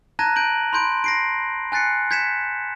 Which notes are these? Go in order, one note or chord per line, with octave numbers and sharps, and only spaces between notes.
A5 A#5 F#6 G#6 A#6 D#7
G6 D7 F#7
B5 C6 G6 D7
A#6 C7 D7
G#5 F#6 A6 C7 C#7
G6 G#6 B6 C#7 E7